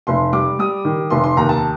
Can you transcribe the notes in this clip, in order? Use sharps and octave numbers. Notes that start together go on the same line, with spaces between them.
F1 C6
G3 D6
G3 D#6
D#3
F1 C6
C6
D#2 A#5
A5